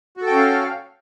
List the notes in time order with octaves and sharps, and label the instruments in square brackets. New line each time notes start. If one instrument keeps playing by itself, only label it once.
[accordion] F#4
A4
G5
C#4
F5